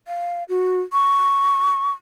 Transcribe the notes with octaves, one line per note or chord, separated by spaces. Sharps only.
F5
F#4
C#6